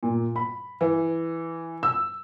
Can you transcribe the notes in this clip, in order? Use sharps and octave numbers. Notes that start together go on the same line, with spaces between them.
A#2
B5
E3
E6